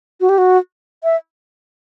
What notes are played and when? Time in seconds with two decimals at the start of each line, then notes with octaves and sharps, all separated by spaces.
0.21 F#4
0.29 G4
0.38 F#4
1.04 E5